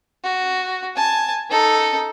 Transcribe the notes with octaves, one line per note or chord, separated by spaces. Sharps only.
F#4
G#5 A5
D#4 A4